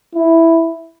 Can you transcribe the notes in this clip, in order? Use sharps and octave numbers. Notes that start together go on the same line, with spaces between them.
E4